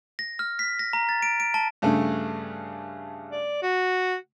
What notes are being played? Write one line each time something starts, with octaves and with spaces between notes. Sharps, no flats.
A#6
F6
B6
A#6
A#5
A6
D7
D7
A5
G2 C#3 A3
D5
F#4